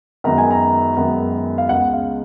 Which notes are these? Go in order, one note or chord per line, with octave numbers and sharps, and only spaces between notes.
F#2 D#3 G#3 B3 A#5
G#5
A#5
F#2 D#3 G#3 B3
F5
C#2 C#3 G#3 B3 F#5
F5